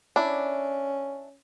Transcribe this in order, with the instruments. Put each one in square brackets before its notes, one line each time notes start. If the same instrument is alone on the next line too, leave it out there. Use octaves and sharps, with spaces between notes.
[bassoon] C#4 [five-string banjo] D4 E4